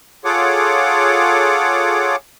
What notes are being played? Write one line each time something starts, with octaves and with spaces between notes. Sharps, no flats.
F4 G#4 A4 C#5 F#5 D6